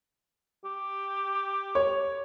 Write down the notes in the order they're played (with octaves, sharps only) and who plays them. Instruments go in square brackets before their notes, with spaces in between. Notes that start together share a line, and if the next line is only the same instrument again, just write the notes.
[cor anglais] G4
[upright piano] C#5